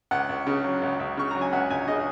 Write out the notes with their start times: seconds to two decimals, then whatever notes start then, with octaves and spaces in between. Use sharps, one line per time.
0.11 C#2 F#5
0.29 C#2
0.47 C#3
0.64 F#3
0.82 C#2
1.00 C#2
1.17 C#3 C#6
1.31 F#3 A#5
1.41 G#5
1.53 C#2 F#5
1.70 C#2 G#5
1.88 C#3 D#5